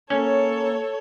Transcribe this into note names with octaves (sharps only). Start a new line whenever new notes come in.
A#3 C#4 A4 C#5